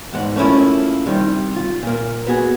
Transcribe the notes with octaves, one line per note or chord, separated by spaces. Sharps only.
E2 G#2 F#5
A3 A#3 C#4 E4 F4
C3 D#3 G3
F4
A#2 A#3
B3 F#4 G#4